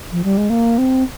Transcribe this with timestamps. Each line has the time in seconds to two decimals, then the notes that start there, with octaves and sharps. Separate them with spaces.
0.12 F3
0.24 G3
0.37 G#3
0.50 A#3
0.78 C4